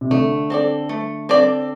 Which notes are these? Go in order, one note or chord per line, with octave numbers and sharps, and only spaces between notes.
C3
D3 A3
C4 A4 D5
A3
C4 A4 D5